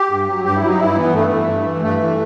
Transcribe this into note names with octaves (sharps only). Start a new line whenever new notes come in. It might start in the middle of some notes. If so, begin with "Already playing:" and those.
Already playing: G4
G2
F#3
G2 G4
E4
F#3
D#4
G2 E4
E3 B3
G2 A3
E3
G2
E3
G2 A3
E3